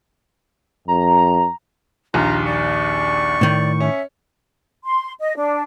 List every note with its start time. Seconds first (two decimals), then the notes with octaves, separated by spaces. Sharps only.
0.88 F2 A#5
2.14 A#1 D#2 F4 A#5
2.46 D5 C#6
3.41 A2 D#3
3.80 C#4 E5
4.84 C6
5.20 D#5
5.36 D4